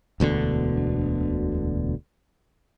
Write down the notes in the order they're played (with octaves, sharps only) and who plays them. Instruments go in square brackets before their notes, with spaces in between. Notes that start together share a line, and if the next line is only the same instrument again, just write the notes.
[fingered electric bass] E1 D2 B2 D3